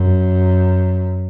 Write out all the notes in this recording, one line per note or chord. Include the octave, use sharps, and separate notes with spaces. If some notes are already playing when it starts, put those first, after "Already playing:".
Already playing: F#2